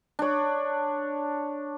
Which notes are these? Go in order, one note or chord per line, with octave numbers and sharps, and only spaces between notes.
D4 C#5